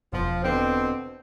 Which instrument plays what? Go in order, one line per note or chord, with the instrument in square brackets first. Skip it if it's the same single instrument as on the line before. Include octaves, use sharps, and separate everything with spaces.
[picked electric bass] E1 [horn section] F3
[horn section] B2 D3 C4